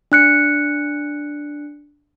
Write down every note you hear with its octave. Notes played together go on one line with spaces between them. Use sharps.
D4 F#6 C#7